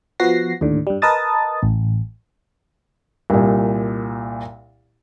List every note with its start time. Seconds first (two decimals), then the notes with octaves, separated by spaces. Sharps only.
0.20 F3 B3 F#4 F#5 A#6 C7
0.61 D#2 A2 D3
0.87 G2 G3
1.02 A#4 B4 D#5 A5 D#6 A6
1.63 A1
3.30 C2 A#2